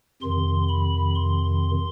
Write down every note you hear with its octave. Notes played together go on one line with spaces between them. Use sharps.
F2 C3 D#3 C6
B5
C6